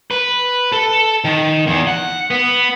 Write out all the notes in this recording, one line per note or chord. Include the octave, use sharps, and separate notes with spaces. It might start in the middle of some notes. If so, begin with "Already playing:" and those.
B4
A4
D#3
E2
F#5
B3